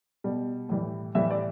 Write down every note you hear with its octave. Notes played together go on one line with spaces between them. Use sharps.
B2 G3
A2 E3 G3
A2 E3 G3 E5
D5